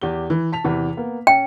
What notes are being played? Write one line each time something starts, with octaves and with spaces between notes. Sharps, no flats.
E2 G4 G7
E3
A5 B6 F7
E2 C3 E3
A#3 B3
C#4 G5